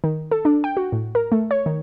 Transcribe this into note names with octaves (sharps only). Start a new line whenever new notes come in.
D#3
A4
D4
G5
F#4
A2
A#4
A3
C#5
D#3